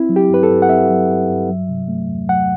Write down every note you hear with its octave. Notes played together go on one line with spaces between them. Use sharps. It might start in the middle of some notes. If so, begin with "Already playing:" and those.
Already playing: C4 E4
F#3
G4
G2 B4
A4
G2
F#5
C4 E5
F#3
G2
G2
F#3
C3
A3
E2
F#3 F#5